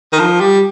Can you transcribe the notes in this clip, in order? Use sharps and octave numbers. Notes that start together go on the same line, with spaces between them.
D#3
F3
G3